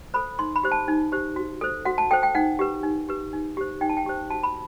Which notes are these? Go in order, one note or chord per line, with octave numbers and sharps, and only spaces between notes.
A4 C5 B5
D#4 C6
B5
G4 C5
A5
D#4
G4 C5
F#4
A4 C5
F#4 F#5
A5
A4 C5 G5
G5
D#4 F#5
G4 B4
D#4
G4 B4
D#4
G4 C5
D#4 G5
A5
G5
G4 C5
F#4 A5
B5